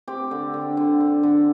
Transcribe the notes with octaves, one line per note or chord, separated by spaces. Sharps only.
C4 G4
D3
D3
D3
D3
D3